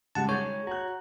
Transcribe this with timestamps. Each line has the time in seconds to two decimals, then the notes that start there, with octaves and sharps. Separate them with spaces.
0.15 C#3 G3 G#3 F#5 A5
0.29 D#3 G#3 G#4 C#5 C#6 G6 D#7
0.67 F#4 A#5 F#6